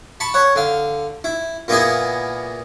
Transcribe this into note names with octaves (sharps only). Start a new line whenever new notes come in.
A5 B5 C#6
C#5 F#5
D3 F5
E4
A#2 A#3 B3 E4 G#4